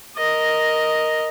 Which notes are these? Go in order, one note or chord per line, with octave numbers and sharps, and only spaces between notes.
A#4 D#5